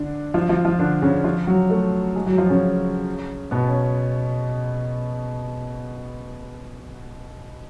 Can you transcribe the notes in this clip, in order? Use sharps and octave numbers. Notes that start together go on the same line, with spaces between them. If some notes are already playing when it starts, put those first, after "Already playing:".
Already playing: D3 D4
F3 F4
F3 F4
F3 F4
D3 D4
C#3 C#4
F3 F4
F#3 F#4
A3 A4
G#3 G#4
F#3 F#4
F3 F4
C#3 C#4
B2 B3
C#4